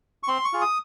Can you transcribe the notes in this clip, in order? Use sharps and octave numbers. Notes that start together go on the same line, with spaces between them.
C#6
C4 C6
C#6
F4 G#4
D#6